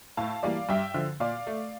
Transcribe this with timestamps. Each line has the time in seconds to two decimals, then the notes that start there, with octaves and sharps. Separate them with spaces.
0.17 A2 F5 A5
0.43 E3 G3 A#3 D5 F5
0.69 G2 E5 G5
0.94 D3 F3
1.20 A#2 D5 F5
1.47 A3